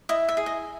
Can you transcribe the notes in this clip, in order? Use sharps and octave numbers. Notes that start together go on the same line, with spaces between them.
E4 D#5
E5
G#4
D#5